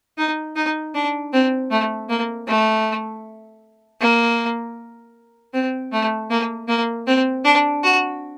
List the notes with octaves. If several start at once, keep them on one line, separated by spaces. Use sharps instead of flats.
D#4
D#4
D4
C4
A3
A#3
A3
A#3
C4
A3
A#3
A#3
C4
D4
F#4